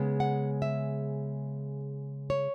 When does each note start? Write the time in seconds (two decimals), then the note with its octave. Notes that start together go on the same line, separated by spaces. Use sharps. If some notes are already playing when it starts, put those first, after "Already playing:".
Already playing: C#3 G#3 B3
0.20 F#5
0.62 E5
2.30 C#5